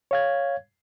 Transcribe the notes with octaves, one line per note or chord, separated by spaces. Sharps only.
C#5 F5 G#6